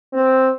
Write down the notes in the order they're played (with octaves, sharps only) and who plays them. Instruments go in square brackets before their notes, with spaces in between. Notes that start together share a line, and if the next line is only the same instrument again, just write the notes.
[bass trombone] C4